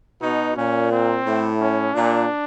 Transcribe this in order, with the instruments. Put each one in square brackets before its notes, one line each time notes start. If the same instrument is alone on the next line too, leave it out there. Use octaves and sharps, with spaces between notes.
[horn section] B2 [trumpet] D#4
[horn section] A#2 [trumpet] C#4
[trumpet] C4
[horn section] A2
[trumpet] C#4
[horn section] A#2 [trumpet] D4